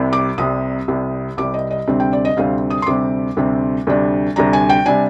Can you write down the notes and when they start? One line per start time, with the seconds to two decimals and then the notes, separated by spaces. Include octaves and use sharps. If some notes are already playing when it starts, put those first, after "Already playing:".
Already playing: C2 C3 G3
0.13 D6
0.38 C2 C3 G3 D#6
0.88 C2 C3 G3
1.37 C2 C3 G3 D6
1.54 D#5
1.71 D#5
1.88 D2 C3 G3 C4
2.00 G5
2.13 D5
2.25 D#5
2.37 D2 C3 G3 C4 F5
2.70 D#6
2.82 C6
2.86 D2 C3 G3 C4 D6
3.37 D2 C3 G3 C4
3.87 D2 C3 G3 D4
4.36 D2 C3 G3 D4 A#5
4.53 G#5
4.69 G5
4.86 C3 G3 D4 G#5